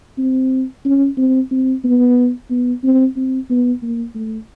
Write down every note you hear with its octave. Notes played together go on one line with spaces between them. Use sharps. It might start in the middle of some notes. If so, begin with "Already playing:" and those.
C4
C#4
C4
C4
B3
B3
C4
C4
B3
A#3
A3